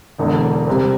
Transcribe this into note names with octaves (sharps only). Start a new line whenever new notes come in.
E1 E2 D3
C3 G3 C4